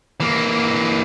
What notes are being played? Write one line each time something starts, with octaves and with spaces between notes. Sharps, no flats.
E3 A#3